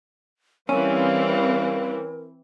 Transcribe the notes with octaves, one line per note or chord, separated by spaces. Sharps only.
E3 G3 C4 C#4 A#4 F5